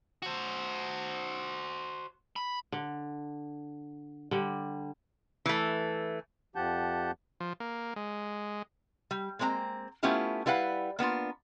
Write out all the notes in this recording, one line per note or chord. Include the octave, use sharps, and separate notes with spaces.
F#4 C5
B5
D3
D3 G3
E3 A3
F2 F3 G4 F#5 A5 G6
F3
A#3
G#3
G3
G#3 A#3 C4 C#5 A#5
A3 B3 C#4 E4 F4 G4
G3 E4 B4 F5 F#5
A#3 B3 D4 F4